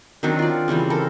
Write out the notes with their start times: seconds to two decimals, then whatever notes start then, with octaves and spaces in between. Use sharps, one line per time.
0.23 D#3 F#3 C4 D4
0.39 F4 D5
0.68 C#3 E3 G3 C4
0.90 A4 A#4